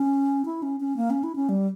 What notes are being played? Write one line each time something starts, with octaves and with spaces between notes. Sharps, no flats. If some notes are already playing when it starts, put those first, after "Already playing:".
Already playing: C#4
E4
C#4
C#4
A#3
C#4
E4
C#4
G3